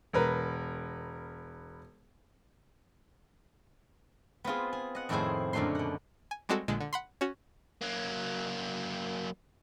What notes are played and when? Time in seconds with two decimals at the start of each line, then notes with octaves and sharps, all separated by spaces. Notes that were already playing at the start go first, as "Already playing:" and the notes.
0.13 E1 A#4 B4
4.44 B3 C4 F4 G#4
4.73 G#4
4.95 D#5 F#5
5.09 F2 A2 D#3 E4 G#4 C5
5.53 F#2 A#2 D3 A3 D#4 C6
5.75 B2 F#5
6.31 G#5
6.49 G3 G#3 C4 F#4 A4
6.68 A#1 A#2 D3 G#3
6.81 D3
6.93 F#5 B5 C6
7.21 C#4 F#4
7.82 F#3 A#3